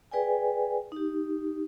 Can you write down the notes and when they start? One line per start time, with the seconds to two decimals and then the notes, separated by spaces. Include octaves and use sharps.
0.11 G#4 B4 D5 G5 G#5
0.92 D#4 G4